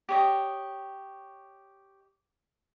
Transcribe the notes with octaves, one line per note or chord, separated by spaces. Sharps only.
G4 C#5 D#5